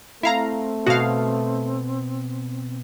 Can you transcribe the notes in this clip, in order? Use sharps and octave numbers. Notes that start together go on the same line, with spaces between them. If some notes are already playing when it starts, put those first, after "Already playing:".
A3 C4 E4 F5 A#5
B2 F#4 F5